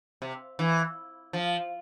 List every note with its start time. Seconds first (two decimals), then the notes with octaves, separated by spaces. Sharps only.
0.22 C3
0.59 E3
1.33 F3